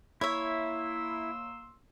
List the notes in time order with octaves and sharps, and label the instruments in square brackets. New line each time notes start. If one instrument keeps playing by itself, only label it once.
[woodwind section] A#3 C6 E6 [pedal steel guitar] E4 [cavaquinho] C#5 E5